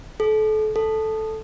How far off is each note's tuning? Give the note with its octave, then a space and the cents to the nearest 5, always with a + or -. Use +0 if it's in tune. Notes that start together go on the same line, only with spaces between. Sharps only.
A4 -30
A4 -5